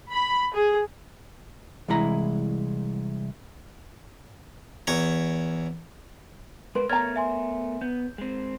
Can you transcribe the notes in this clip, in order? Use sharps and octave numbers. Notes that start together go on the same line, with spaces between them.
B5
G#4
C2 E3 G#3 E4 A#5
E2 C#5 A#5
G#3 A#4 B4 C6
A3 B3 A#4 C#5 A#5 F6 G#6 A6
E5 G#5 C6
B3 G6
G#3 C4